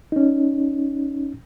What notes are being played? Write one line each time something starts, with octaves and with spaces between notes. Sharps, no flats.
C#4 D#4